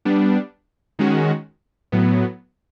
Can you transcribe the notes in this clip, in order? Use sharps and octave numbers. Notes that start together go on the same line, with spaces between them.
G3 B3 D4
D#3 G#3 C#4 F#4
A2 F#3 B3